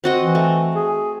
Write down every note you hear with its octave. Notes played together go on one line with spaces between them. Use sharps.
C4 F#4 D#5
E3
A3
G#4